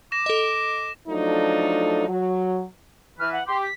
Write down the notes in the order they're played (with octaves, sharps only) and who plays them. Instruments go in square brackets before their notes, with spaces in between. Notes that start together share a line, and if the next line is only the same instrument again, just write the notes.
[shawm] D6 [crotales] A#6 E7
[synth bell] A4 D#5
[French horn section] F3 F#3 A3 D4 D#4 A4
F#3
[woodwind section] E3 B4 [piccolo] F6
[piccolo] F#5
[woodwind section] G4 [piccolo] C6
[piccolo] B6